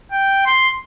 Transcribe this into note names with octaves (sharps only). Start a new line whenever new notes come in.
G5
C6